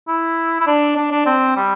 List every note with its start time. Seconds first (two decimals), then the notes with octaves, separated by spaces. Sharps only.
0.08 E4
0.61 E4
0.67 D4
0.97 D4
1.12 D4
1.26 C4
1.56 G3